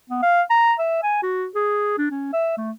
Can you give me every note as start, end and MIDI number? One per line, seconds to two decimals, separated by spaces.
0.10 0.22 59
0.22 0.42 77
0.50 0.73 82
0.79 1.02 76
1.03 1.20 80
1.22 1.46 66
1.55 1.96 68
1.98 2.08 62
2.11 2.29 61
2.33 2.52 76
2.57 2.71 57